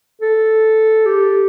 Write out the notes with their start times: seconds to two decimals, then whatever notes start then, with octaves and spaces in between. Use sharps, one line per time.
0.21 A4
1.06 G4